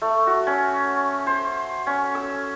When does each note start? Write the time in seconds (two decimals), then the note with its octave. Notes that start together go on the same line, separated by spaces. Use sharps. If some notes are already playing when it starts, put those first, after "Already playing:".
0.02 A3
0.27 F#4
0.47 C#4
1.27 C5
1.87 C#4
2.15 E6